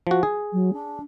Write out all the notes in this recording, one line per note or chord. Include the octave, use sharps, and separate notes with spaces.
F3 F#4
G#4
F#3
D4